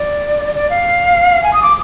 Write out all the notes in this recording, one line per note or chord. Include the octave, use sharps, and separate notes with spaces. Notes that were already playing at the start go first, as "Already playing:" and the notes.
Already playing: D5
D5
F5
G#5
D#6
D6